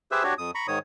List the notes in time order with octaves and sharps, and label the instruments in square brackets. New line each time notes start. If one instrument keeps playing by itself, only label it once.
[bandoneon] G4 G#4 B4 C5 E5 E6
D4 F#4 G4 C#5
F2 D#6
A#5 B5 C#6
G#2 D#3 C#5 D#6